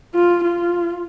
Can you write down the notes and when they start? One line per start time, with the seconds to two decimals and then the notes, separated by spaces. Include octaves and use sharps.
0.14 F4
0.44 F4